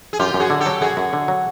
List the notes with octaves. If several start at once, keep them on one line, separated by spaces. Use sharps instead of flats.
G#4
F#2 F4 G4
F#2
F#4 G#4
D3
G4 A4
F#3
F#2 F#4 G#4
F#2
D3
F#3